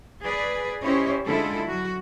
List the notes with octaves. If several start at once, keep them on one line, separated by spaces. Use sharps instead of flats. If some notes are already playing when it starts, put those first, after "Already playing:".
G#4 B4 D5
C#4 E4 G4 C5 C#5 D#5
D3 G#3 E4 F4 A4
F#3 F#4